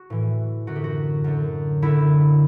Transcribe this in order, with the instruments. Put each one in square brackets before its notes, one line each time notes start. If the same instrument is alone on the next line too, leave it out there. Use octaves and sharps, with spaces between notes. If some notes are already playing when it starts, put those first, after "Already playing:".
Already playing: [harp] F#4
A2 E3
F#2 D3 F#4
G4
F#4
F#2 D3
F#2 D3 E4